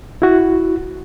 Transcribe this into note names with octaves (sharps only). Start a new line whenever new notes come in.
E4 F#4